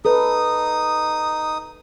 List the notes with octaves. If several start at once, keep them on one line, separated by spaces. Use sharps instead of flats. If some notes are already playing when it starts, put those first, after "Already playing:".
D#4 A4 B4 D#6